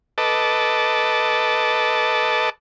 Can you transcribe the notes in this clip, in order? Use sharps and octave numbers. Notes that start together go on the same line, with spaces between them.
A4 B4 D#5 A5 D6